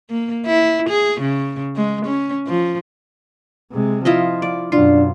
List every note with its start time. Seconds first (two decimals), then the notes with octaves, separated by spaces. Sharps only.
0.10 A#3
0.46 E4
0.89 G#4
1.21 C#3
1.76 G#3
2.06 C#4
2.48 F3
3.72 C3 G#3
4.05 F3 E4 F4 D#5
4.42 D5
4.72 F#2 B2 D4 F4